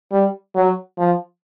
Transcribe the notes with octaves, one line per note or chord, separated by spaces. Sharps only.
G3
F#3
F3